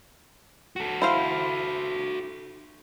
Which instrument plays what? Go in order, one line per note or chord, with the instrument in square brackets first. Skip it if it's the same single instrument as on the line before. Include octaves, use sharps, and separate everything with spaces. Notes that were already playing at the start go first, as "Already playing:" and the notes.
[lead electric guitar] F#4 A4
[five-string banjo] E4 C5 F5